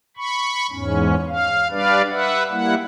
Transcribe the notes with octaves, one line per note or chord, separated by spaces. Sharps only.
B5 C#6
E2 G#2 C#4
F5
G3 D4 B4 D5 F5
B4 E5 F#5
G3 A#3 E4 F#5